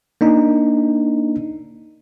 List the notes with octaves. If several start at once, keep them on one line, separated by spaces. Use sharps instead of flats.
A#3 D4 D#4